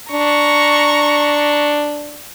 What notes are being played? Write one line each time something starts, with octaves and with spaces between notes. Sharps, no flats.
D4 A#5 C#6